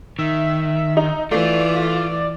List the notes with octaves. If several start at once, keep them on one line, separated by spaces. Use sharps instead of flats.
D#3 E5
D#4
E3 A3 F4 D5